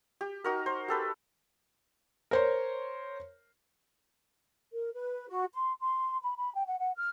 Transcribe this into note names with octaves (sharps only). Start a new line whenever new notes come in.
G4
D#4 F#4 A#4
C5
G4 A4 B4
A#4 C5 C#5
A#4
B4
F#4
C6
C6
B5
B5
G5
F#5
F#5
F6